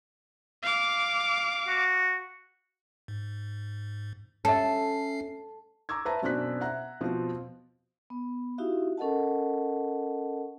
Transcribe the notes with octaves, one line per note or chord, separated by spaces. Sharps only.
F5 D6
F#4
G#2
C#4 A4 C#5 E5 C7
A#5 C#6 D6 E6 G#6
B4 C5 E5 A5 A#5
F#2 B2 C4 D4 F#6 B6
E5 F#5 A#5 F#6
B2 F3 C4
B3
D#4 E4 F#4 G4 E5 F5
C#4 A4 A#4 D#5 F#5 A5